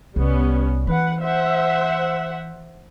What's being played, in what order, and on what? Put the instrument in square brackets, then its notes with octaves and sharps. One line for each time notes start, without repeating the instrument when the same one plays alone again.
[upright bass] C2 [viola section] G3 B3 C#4
[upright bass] E3 [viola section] B4 F#5
[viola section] C5 E5 F#5